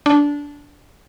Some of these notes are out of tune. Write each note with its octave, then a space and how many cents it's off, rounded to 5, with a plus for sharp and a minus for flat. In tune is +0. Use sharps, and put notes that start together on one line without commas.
D4 -15